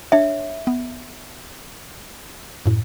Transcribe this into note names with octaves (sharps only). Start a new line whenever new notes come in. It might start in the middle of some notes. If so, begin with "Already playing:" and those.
D4 C#5 E5
B3
F#2 A2